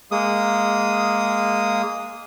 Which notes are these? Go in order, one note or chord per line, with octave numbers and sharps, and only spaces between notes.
G#3 A#3 D#6